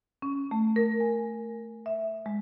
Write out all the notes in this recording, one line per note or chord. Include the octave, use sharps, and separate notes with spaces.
C#4
A3
A#4
G#5
E5
G#3